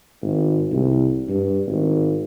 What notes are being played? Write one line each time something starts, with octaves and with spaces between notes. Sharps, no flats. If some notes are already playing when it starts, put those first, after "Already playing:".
G#1
C2
G2
G#1